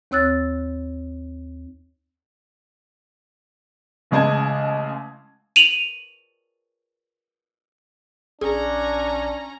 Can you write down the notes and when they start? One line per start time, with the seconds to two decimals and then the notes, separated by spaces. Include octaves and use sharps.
0.11 D#2 C4 C#5 E6 F#6 A6
4.11 A1 C#3 G#3 D#5 A5 G#6
5.56 D#7 F7 F#7
8.41 A#1 C#4 D4 G#4 A#5